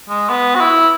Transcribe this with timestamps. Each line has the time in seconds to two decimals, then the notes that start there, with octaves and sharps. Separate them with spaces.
0.09 G#3
0.29 B3
0.55 F#4
0.61 E4